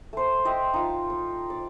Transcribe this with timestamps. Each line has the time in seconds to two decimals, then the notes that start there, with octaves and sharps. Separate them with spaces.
0.13 A3 C5
0.45 D#5 E5 G5 C6
0.74 D#4 F4 F5
1.10 D#6
1.50 D5